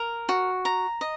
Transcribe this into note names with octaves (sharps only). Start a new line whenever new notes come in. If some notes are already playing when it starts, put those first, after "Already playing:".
Already playing: A#4
F#4
A#5
D#5